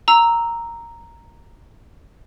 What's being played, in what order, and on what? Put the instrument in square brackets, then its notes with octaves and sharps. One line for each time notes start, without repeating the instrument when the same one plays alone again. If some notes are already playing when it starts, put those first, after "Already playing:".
[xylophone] A#5 E6